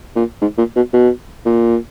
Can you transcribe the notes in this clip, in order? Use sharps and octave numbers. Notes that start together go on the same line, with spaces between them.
A#2
G#2
A#2
B2
B2
A#2